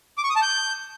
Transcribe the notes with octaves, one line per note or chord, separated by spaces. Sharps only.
D6
C#6
D#6
A5
G6